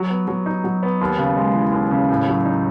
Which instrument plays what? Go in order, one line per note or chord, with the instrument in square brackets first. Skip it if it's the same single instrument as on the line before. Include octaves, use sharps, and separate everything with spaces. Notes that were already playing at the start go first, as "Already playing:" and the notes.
Already playing: [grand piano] F#3
B3
F#3
D#4
F#3
B3
D#2
C#3
G#3
E3
D#2
C#3
A2
F#3
D#4